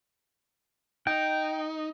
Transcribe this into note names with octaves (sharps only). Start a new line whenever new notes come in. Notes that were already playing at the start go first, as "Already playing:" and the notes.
D#4 G5